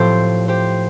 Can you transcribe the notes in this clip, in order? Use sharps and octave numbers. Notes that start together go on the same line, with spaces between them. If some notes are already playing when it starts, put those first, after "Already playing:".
Already playing: A2 F3 C4 G4 C5
G4 C5